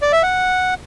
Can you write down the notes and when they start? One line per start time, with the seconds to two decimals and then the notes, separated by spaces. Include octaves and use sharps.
0.02 D5
0.12 E5
0.23 F#5